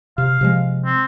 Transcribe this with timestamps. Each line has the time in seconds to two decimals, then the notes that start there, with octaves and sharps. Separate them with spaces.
0.18 C3 F5
0.41 C3 F3 G#3
0.85 C4